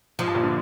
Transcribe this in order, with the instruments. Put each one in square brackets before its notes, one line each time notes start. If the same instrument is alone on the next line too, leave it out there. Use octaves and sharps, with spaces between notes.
[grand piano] G#2 [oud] F3
[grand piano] G2
A#1 A#2
D3